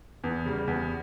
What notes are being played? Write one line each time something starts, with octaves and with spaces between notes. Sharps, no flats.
E2
C#3 G3
E2